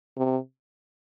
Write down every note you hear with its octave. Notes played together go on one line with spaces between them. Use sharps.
C3